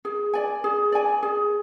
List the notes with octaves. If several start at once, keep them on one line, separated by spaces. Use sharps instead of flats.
G#4
D5 G#5
G#4
D5 G#5
G#4